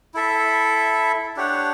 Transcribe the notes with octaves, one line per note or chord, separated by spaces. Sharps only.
E4 A4 E5
D4 G4 C#5 F#5